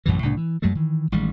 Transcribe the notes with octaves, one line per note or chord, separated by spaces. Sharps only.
A1 F#2 B2 E3
C2 A2 C#3 D4
E3
F#2 F#3 G#3 A3
D#3 E3
A1 D#3 G3 G#3